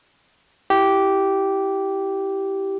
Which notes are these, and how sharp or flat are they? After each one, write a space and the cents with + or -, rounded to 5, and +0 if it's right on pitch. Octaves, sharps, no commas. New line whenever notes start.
E4 -5 G4 -10